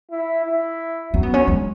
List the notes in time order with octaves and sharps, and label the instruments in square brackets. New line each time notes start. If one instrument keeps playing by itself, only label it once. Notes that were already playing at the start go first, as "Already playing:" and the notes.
[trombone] E4
E4
[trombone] F#3 [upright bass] C#4
[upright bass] B3
C#4
G#3